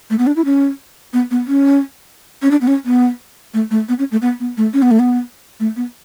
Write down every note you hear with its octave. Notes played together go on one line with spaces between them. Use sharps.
A3
B3
D4
E4
C#4
B3
B3
C#4
C#4
D4
B3
C#4
B3
A3
A3
B3
C#4
A3
B3
B3
A3
C#4
B3
A3
B3
A3
B3